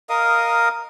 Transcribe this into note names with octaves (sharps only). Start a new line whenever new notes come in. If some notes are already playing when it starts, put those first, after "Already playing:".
A#4 D#5 F5 D#6